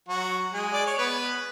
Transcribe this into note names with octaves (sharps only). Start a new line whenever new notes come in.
F#3 F#4
G#3 G#4
D5
C#5
B3 B4